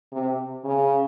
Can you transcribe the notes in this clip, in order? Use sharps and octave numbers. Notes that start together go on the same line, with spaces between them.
C3
C#3